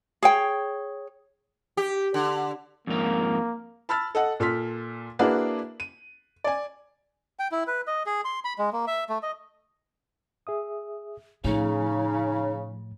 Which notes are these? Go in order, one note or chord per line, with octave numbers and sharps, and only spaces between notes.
G#4 C#5 G5
G4
D3
F2 G#2 A#3 A#4
A5 B5 E6 F6 A6
A4 D#5 F#5
A#2 A4 C6 F6 B6
A#3 D4 E4 F#4 G#4 B4
D#7
D5 G#5
G5
E4
B4
D#5
G#4
C6
B5
G#3
A#3
E5
A3
D#5
G#4 E5 D#6
A2 C#3 F3 A3 D#4